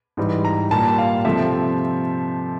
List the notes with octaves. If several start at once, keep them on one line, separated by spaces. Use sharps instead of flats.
G#2 E3 G3
A#5
A#2 G3 A5
F5
C3 F3 A3 E5